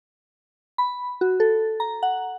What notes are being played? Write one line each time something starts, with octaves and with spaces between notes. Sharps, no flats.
B5
F#4
A4
A#5
F#5